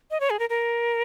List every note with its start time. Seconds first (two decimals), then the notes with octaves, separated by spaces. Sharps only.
0.11 D#5
0.20 C#5
0.30 G#4
0.39 A#4
0.50 A#4